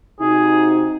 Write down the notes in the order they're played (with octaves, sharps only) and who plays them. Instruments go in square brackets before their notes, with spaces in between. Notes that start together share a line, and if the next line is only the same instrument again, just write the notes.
[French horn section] C3 D#4 F#4 [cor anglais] G#4